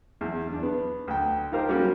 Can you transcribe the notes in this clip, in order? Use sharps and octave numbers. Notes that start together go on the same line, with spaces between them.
E2
E2 D4
B3
D2 G5
D#4 F4 G4 A#4 C5
F#3 G3 A#3 C#4 F#4